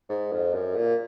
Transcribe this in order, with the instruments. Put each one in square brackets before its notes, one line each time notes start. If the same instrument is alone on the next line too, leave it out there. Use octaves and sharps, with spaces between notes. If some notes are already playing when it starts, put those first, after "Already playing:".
[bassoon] G#2
F2
F#2
A#2